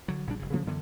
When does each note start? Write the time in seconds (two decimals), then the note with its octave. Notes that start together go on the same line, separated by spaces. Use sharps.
0.08 D3 F#3
0.27 A#1 A#2 G3 D4
0.39 F#1 C#3
0.52 C#3 F3 A#3 B3
0.66 F#2 D3 E3 B3